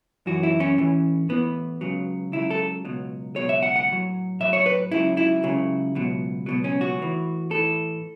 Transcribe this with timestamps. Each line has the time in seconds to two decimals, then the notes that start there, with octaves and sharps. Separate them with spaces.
0.26 F#2 E3 F#4
0.43 E4
0.60 C#4
0.78 A2 E3
1.29 A2 E3 B3
1.81 C#2 C#3 F#3
2.32 C#2 C#3 F#3 E4
2.51 A4
2.85 C#2 B2 F#3
3.36 C#2 B2 F#3 C#5
3.49 E5
3.63 F#5
3.76 F#5
3.88 A2 F#3
4.40 A2 F#3 E5
4.53 C#5
4.66 B4
4.92 C#2 C#3 F#3 E4
5.17 E4
5.43 C#2 C#3 F#3
5.95 C#2 B2 F#3
6.46 C#2 B2 F#3
6.64 C#4
6.81 F#4
6.99 A2 E3
7.50 A2 E3 A4